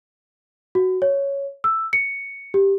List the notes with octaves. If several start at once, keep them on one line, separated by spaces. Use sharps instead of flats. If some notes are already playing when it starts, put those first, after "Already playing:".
F#4
C#5
E6
C#7
G4